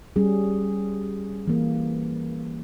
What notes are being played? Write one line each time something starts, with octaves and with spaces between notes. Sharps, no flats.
G3 C#4 G#4
E3 A#3